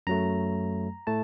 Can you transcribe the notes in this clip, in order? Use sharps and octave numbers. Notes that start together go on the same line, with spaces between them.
F#2 F#3 A3 A#5
A2 A3 A5